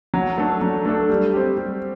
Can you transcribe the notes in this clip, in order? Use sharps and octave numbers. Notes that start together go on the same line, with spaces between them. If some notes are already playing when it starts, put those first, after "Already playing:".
F#3
A3 D4 A4
F#3
A3 D4 A4
G3
C4 G4
G3